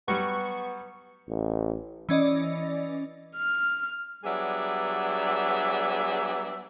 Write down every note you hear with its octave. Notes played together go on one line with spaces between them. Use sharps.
F#3 G3 B3 C#6
A1
E3 C#4 D5 D#5
F6
F#3 G3 B3 D4 G#4 E5